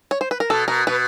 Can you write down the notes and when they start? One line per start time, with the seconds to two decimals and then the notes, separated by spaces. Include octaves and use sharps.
0.11 C#5
0.21 C5
0.31 B4
0.40 A#4
0.50 B2 A4
0.68 B2 A#4
0.87 B2 B4